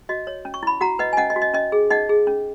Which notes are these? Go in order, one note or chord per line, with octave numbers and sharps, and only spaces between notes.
F#4 D#5
C#5
C#4
C#6
E4 B5
F#4 F#5 A#5
B4 D#5 F#5
G#5
C#4 D#5 F#5
D#5
F#4
D#5
C#4 D#5
G#4
D#4 D#5 F#5
G#4
C#4